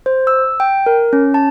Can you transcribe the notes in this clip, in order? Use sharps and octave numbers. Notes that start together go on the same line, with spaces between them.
C5
E6
G5
A#4
C#4
A5